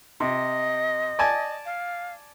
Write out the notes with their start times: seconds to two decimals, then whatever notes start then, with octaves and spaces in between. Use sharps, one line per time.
0.20 C3 D#5
1.19 D5 G#5 A5
1.66 F5